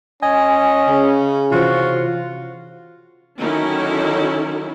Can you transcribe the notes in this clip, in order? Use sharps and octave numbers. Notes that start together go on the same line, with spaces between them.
C#4 D#5 G#5
C#3
C3 E3 F4 F#4 C5
D3 D#3 F#3 C#4 D#4 E4